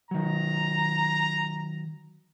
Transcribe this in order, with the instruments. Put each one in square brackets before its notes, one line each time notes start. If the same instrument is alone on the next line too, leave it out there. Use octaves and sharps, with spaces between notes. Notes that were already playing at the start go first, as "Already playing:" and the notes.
[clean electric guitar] D#3 F#3 [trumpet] A#5